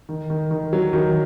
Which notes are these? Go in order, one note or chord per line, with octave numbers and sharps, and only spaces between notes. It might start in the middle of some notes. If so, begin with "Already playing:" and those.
D#3
D#3
D#3
F#3
D#3